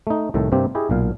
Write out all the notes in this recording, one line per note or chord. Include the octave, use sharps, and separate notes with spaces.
A3 D#4
C2 A2 D#3 A3 A4
G2 C3 A#3 C4 G4
E4 G4 G#4 D#5
B1 A#2 F5